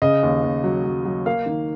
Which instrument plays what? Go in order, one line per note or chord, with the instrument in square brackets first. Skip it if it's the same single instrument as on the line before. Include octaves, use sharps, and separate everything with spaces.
[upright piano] C#3 D#5
D#2
D#2
F#3
F#3
F#3
A#3 F5
D#3